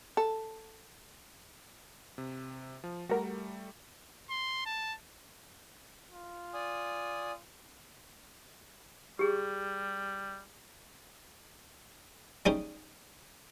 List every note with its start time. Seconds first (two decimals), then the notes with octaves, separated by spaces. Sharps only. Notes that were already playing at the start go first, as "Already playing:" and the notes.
0.17 A4
2.18 C3
2.84 F3
3.09 G3 A3 F#4 A#4
4.30 C6
4.65 A5
6.12 F4
6.54 D5 G#5 D#6
9.19 G3 G4 G#4
12.46 G3 C#4 D#4 G#4 C5